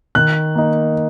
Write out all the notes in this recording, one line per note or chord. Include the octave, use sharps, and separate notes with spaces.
D#3 F#6
A#3 D#4